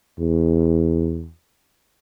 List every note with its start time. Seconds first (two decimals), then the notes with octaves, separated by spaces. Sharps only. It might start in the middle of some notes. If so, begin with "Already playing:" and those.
0.19 E2